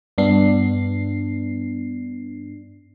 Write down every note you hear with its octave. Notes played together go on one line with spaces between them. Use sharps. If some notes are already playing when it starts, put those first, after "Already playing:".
G2 B3 D4 C7